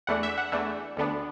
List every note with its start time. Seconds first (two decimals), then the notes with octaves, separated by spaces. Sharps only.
0.07 E2 E3 A3 D4 F#5
0.23 E5
0.38 F#5
0.52 E2 E3 A3 D4
0.96 D2 D3 B3 D4